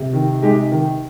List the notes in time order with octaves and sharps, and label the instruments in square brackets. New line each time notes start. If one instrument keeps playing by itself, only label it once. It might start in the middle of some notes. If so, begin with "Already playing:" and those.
Already playing: [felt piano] C3
[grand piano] D#3
G#3 D#4 G4
D#3